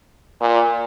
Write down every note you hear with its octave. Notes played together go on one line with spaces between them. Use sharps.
A#2